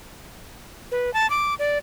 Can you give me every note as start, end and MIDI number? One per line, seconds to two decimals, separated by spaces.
0.91 1.12 71
1.14 1.29 81
1.30 1.54 86
1.59 1.78 74